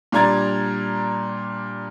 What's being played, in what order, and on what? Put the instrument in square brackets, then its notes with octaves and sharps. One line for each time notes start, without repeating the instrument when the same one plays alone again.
[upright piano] A#2 G3 D4 A#5 G#6 A6